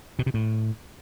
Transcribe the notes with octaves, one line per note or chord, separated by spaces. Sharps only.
B2
C3
A2